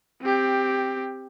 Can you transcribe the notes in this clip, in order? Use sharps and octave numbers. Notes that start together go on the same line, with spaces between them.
C4 G4